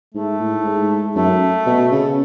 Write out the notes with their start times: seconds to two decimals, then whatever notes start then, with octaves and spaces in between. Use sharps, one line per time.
0.14 G#2 A3
0.40 A2
0.65 G#2
1.15 F#2 A3
1.66 B2
1.91 C#3